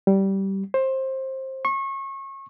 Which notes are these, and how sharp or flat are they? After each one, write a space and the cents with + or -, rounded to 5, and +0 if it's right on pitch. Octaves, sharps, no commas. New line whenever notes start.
G3 -15
C5 +20
C#6 -30